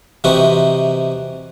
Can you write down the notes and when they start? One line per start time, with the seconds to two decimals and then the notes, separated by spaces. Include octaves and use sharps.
0.24 C3 E3 D#4 F#4